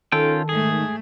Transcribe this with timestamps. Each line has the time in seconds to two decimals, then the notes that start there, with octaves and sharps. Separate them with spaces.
0.12 D#3 C#4 F4 A4 G5
0.49 G#2 A3 G#4